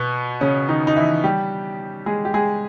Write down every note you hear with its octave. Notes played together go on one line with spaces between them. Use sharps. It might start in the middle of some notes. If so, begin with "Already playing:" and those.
Already playing: B2 B3
C#3 C#4
D#3 D#4
D#4
E3 E4
G3 G4
G#3 G#4
G4
G#3 G#4